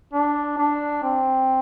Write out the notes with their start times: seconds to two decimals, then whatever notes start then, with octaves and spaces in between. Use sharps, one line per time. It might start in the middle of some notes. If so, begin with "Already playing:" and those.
0.13 D4
0.58 D4
1.03 C4